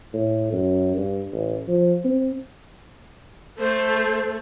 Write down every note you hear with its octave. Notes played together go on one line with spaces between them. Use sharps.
A2
F#2
G2
A1
F3
C4
A3 C5